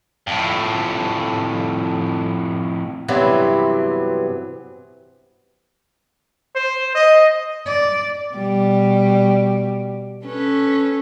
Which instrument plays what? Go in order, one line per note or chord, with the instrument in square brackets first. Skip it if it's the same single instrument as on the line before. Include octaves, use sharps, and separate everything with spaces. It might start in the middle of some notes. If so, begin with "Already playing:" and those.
[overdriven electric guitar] F2 A2
[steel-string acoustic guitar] G2 C3 E3 F#3 B3 C4
[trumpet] C5
D#5
[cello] D5
[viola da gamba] B2 G3
C#4 A4 B4